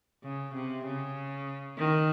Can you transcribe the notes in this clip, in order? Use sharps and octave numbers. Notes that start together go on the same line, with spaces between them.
C#3
C3
C#3
D#3